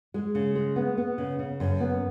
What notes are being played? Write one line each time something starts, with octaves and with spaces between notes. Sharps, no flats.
G#3
C#3
G#3
B3
B3
C#3
C#3
F#2
B3